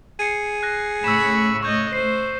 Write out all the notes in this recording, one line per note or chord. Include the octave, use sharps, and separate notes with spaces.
G#4 C7 C#7 D#7
F#6 A#6
A2 C#3 A3 B5 C#6 E6 E7
C#5 D#5 C#6 E6 G6
C5 C7